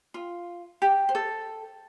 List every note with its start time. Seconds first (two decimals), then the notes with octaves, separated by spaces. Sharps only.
0.14 F4
0.82 G4
1.09 C5
1.15 A4